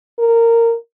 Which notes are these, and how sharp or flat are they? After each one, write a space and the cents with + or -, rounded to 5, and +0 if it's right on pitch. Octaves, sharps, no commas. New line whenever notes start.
A#4 -15